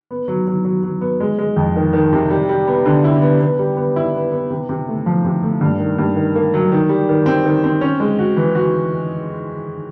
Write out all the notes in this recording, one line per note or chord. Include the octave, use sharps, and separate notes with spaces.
B3
F#3
F#3
F#3
F#3
B3
G#3
G#3
F2
D#3
D#3
C3
G3
G3
B3
D3
E4
B3
B3
G3
B3
E4
B3
B3
C3
C3
A3
F3
C3
A3
G2
D#3
G2
D#3
A#3
F#3
D#3
G3
D#3
C4
D#3
C4
C#4
G#3
F#4
E3
F#4